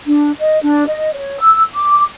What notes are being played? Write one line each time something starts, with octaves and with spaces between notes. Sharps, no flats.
D4
D#5
D4
D#5
C#5
E6
D6